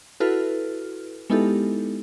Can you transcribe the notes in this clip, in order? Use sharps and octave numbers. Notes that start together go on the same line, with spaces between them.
E4 F#4 A4 B4 F6
G#3 B3 D#4 E4 G4 A4